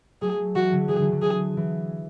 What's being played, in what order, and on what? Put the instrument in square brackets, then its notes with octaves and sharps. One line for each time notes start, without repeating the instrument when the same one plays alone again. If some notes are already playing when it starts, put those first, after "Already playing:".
[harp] F#3 A3 [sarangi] G#4
[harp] E3 G#3 [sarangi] F#4
[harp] D3 F#3
[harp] E3 [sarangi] G#4
[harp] D3 F#3
D3
[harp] E3 [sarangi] G#4
[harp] E3